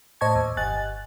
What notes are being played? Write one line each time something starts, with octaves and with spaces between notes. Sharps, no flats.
A2 C5 D#5 A5 C#6 G#6
D#2
G1 D#5 G#5 F#6 A6